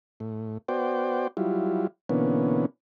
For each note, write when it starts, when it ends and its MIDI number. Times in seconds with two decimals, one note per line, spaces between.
0.20 0.58 45
0.68 1.27 59
0.68 1.27 66
0.68 1.27 72
0.68 1.27 74
0.68 1.27 79
1.37 1.87 54
1.37 1.87 55
1.37 1.87 64
1.37 1.87 65
2.09 2.66 47
2.09 2.66 50
2.09 2.66 52
2.09 2.66 58
2.09 2.66 59
2.09 2.66 61